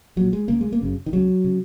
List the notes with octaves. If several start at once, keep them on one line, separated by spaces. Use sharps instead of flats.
A#1 A#2 F#3
G#3
C#2 C#3 A#3
G#3
A#3
F#1 F#2 C#3
D#3
C#2 C#3 F#3
C#3